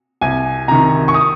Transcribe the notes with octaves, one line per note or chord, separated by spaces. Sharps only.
C2 G#5
C3 D#3 A#5
C#6
D#6